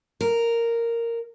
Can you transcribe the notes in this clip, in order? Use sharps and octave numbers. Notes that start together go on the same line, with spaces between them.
A#4